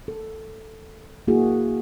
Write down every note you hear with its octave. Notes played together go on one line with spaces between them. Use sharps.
A4
A#3 E4 F#4 G#4